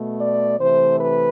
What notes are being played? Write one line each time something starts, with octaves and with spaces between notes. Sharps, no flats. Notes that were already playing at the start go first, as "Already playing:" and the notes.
Already playing: B2 A3
D5
C3 E3 A3 C5
B4